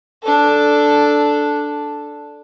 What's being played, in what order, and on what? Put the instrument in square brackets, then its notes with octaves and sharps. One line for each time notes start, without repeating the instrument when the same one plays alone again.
[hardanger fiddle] D4 A4